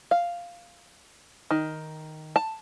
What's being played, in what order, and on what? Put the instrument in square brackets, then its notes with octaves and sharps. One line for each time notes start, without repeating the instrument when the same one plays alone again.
[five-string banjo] F5
D#3
A5